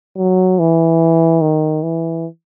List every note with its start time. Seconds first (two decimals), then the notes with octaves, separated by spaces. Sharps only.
0.17 F#3
0.59 E3
1.41 D#3
1.83 E3